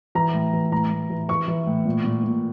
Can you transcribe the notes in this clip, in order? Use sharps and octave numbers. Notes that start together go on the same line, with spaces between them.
E3 A#5
A2
E3
A2 A#5
A2
E3
E3 C#6
E3
A2
A#2
A#2
A#2